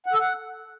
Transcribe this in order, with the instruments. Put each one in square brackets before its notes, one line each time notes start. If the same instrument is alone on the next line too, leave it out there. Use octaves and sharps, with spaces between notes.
[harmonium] F#5
A4
F#5